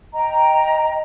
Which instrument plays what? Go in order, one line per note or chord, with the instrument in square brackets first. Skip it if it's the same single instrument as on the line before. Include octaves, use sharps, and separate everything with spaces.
[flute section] D#5 G5 A#5